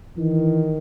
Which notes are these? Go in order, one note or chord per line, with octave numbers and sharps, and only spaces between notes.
D#3 E3